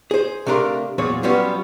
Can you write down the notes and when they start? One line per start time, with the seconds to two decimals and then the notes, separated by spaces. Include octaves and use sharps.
0.11 G#4 C5
0.47 C3 A3 D4 A#4 F5 C6
0.98 E2 A#2 F#3 G#4 C5 C#5
1.23 F#3 G3 B3 C#4 F4